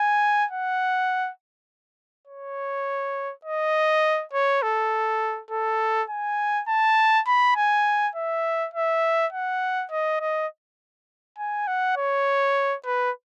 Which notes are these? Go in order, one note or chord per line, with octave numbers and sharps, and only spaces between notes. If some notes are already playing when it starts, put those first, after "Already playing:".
Already playing: G#5
F#5
C#5
D#5
C#5
A4
A4
G#5
A5
B5
G#5
E5
E5
F#5
D#5
D#5
G#5
F#5
C#5
B4